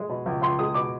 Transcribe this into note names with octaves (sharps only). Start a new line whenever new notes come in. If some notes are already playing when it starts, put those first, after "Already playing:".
Already playing: G#3
B2
C#2
C#2 C6
G#3 D#6
B2 D6